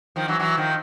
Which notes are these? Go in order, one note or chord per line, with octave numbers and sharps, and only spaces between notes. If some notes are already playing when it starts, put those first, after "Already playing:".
D#3 F3
E3 F#3
E3 F#3
D#3 F3